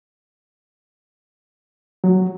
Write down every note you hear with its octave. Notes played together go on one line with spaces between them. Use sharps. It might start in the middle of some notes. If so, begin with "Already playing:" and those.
F#3